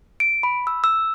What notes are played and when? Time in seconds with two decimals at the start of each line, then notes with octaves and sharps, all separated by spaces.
0.20 D7
0.43 B5
0.67 E6
0.84 E6